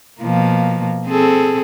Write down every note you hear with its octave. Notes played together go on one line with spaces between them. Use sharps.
B2 F3 A#3
C4 G#4 A4